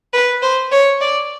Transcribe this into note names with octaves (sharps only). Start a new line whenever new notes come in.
B4
C5
C#5
D5